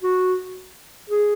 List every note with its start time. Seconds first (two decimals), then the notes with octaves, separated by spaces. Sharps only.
0.03 F#4
1.10 G#4